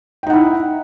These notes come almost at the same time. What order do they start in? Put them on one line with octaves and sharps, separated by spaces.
G5 D#4 F#5 E4